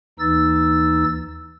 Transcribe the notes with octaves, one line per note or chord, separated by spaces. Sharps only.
D#2 E3 D#4 E6 A6